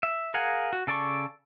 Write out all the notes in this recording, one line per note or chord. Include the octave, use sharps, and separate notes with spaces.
E5
G#4 A#4 F5 F#5 G#5
F#4
C#3 A4 D5 A5 C#6